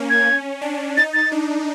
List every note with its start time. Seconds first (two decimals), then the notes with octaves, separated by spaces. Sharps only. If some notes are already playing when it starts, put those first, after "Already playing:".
Already playing: A#3 C#4
0.10 G#6
0.62 D4
0.97 D#4 A6
1.14 A6
1.32 D4